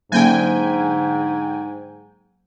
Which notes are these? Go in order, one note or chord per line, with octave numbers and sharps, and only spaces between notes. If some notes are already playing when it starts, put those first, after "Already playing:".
G#2 D3 F#3 A#3 C#4 G5 G#5